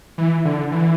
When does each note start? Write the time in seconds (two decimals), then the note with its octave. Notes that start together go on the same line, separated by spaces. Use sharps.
0.18 E3
0.45 D3
0.71 E3